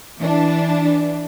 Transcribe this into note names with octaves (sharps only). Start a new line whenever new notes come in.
E3 D4